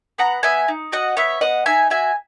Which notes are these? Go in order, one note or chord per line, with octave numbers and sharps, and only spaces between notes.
B3 F#5 A#5
B3 E5 G#5
D#4
F#4 D#5 F#5
B3 C#5 E5
B3 D#5 F#5
D#4 E5 G#5
F#4 E5 G#5